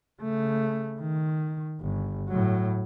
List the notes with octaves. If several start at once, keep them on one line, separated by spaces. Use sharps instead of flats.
C#3 A3
D#3
G1
A2 F#3